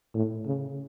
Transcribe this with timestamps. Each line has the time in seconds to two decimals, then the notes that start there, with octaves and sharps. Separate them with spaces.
0.14 A2
0.46 C#3